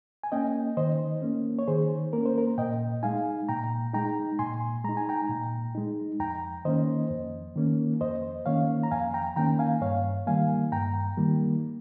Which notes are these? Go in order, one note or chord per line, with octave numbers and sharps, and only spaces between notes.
G#5
A#3 C#4 D#5 G5
D#3 C5 D#5
A#3 C#4
C#5
D#3 G#4 C5
A#3 C#4 A#4
C5
A#4
A#2 D#5 G5
G#3 D#4 F5 G#5
A#2 G5 A#5
G#3 D#4 G5 A#5
A#2 G#5 C6
G#3 D#4 A#5
G#5
G5 A#5
A#2
G#3 D#4
F2 G5 A#5
D#3 A#3 C#4 C5 D#5
F2
D#3 A#3 C#4
F2 C5 D#5
D#3 A#3 C#4 C#5 F5
A#5
F2 F5 G#5
G5 A#5
D#3 A#3 C#4 G5 A#5
F5 G#5
G2 C#5 F5
D#3 G3 A#3 F5 G#5
G2 G5 A#5
D#3 G3 A#3